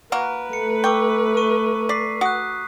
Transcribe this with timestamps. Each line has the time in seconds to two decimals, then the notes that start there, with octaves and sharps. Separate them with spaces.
0.12 A#3 F#4 A#4 B4 A#5
0.53 A3 C#7
0.84 G5 C#6 D6 E6
1.37 C#6 D#7
1.89 D5 B6 C7
2.21 F#4 D#6 F#6